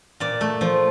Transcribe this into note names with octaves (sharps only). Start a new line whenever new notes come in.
A#2 D5
A3
F3